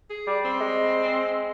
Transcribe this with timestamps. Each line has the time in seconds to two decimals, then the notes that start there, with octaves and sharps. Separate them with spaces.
0.10 G#4
0.27 G3
0.45 C4
0.60 G#3